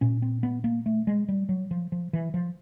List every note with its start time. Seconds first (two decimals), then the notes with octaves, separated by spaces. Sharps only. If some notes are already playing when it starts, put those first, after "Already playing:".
0.01 A#2 C#4
0.22 C4
0.43 B3
0.64 A#3
0.86 A3
1.07 G#3
1.29 G3
1.49 F#3
1.71 F3
1.92 F3
2.13 E3
2.34 F3